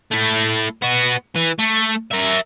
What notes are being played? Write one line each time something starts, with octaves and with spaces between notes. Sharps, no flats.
A3 E4
B3 F#4
E3
A3
A#4 E5